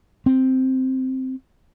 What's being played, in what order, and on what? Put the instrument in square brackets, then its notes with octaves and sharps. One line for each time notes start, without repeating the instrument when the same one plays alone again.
[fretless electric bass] C4